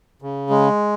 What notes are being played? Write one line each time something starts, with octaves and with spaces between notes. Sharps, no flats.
C#3
G#3